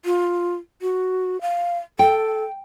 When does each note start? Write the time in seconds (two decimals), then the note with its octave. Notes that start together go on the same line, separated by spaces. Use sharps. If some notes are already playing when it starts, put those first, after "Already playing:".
0.05 F4
0.82 F#4
1.41 F5
1.99 A4 G5